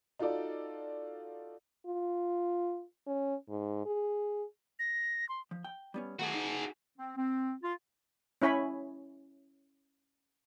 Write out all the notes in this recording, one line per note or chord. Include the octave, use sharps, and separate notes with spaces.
D#4 F4 F#4 A4 D5
F4
C#4
G#2
G#4
A#6
C6
F3
G5
G3 B3 C#4
D#3 A3 F#4 G#4 A4
D#4
C4
C4
F4
C#4 E4 C#5 G#5 B5